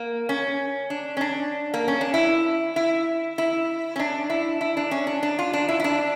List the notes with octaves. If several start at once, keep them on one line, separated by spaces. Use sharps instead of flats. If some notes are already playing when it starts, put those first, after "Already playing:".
Already playing: A#3
C#4
D4
C#4
D4
A#3
C#4
D4
E4
E4
E4
C#4
D4
E4
E4
D4
C#4
D4
D4
F4
D4
E4
E4
D4